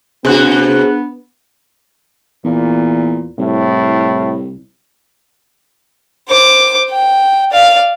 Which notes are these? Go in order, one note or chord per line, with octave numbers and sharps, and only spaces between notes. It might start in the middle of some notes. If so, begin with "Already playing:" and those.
C3 B3 D4 F#4 G#4 C5 F#6
E2 A#2
C2 A2
C5 D6
G5
D5 F5